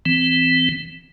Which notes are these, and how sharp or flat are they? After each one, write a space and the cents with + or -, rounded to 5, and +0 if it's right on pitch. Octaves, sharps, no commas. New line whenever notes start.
E3 +0 C4 -25